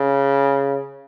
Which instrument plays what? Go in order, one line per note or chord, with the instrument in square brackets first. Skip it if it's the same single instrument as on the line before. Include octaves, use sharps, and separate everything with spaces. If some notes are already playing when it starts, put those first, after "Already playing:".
Already playing: [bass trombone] C#3